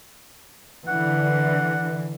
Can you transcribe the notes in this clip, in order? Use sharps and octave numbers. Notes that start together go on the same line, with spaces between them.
D3 E3 F#5